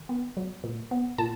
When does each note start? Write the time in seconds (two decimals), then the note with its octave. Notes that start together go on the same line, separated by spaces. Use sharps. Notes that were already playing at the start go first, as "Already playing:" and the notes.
Already playing: D#3
0.09 B3
0.37 F#3
0.64 A#2
0.91 B3
1.18 A#2 A5